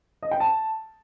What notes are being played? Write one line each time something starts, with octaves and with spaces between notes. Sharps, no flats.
D#5
G5
A5